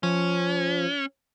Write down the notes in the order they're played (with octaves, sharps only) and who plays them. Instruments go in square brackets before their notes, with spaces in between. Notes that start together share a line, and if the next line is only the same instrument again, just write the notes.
[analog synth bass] F3 [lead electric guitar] C#4